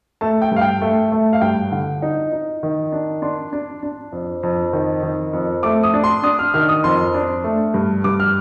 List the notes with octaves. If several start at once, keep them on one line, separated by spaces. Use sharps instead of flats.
A3 A5
G5
G2
F5
G5
A3
A3
F5
G2 G5
D3
D#4
D#4
D#3
D4
D4 C6
D4
D4
F2
F2
D#3
D#3
F2
A3 D6
D#6
D4
C6
D4 D#6
F6
D#3 F6
D#6
F2 C6
D4
A3
G2
G2 D6
F6